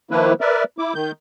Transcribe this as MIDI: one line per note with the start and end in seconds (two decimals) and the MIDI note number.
0.11 0.33 51
0.11 0.33 53
0.11 0.33 58
0.11 0.33 64
0.11 0.33 71
0.41 0.64 70
0.41 0.64 71
0.41 0.64 74
0.41 0.64 76
0.78 0.93 64
0.78 0.93 86
0.94 1.11 51
0.94 1.11 91